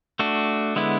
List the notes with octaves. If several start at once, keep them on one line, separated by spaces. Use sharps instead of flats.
A3 D4 F#4
D3 G#3 B3 E4